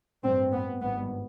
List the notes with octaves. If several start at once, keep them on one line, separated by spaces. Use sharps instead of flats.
A1 G2 C4
B3
G#1 G2 B3